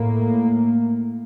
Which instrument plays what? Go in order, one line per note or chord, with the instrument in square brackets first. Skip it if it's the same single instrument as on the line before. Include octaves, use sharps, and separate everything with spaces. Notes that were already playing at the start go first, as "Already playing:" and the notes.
Already playing: [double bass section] A2 A#3